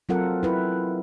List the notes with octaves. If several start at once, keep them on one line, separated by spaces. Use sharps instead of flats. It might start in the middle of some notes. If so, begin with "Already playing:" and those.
F#3 C4 F4 A4 A#4 F#5
E4 B4